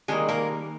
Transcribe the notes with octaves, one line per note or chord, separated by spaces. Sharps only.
D#3 G3 G#3 A#3 G#4
A#3 A#4